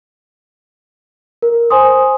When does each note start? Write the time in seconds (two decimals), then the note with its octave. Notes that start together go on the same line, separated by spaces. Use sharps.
1.42 A#4
1.70 C5 G#5 C6 D#6